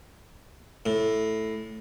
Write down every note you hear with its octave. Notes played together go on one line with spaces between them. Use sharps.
A2